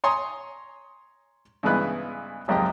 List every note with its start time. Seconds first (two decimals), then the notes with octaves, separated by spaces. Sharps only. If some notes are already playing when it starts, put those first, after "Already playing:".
0.04 C#5 G#5 A#5 C6 D#6
1.63 G2 C#3 E3 G#3 B3 F#6
2.48 G#1 C#2 F#2 F3 G4 D#5